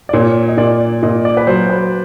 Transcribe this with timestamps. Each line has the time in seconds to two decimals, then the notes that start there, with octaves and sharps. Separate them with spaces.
0.09 D5
0.13 A#2 C#5
0.48 D#5
0.57 A#2 D5
1.03 A#2 D#5
1.25 D5
1.37 B4
1.47 F#3 C5
1.70 B4